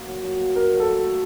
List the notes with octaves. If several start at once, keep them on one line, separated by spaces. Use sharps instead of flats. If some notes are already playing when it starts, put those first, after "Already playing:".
Already playing: A#3 F#4
F#3
F#3
A#3
F#4 A#4
F#3
A4
F#3
A3